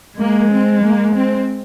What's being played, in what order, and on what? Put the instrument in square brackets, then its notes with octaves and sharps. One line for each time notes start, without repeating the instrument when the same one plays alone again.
[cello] G#3 [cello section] A#3
[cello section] C4
A#3
C4